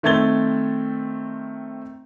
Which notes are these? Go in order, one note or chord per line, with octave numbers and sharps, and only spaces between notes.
D#3 A3 C4 G#6 A6 G7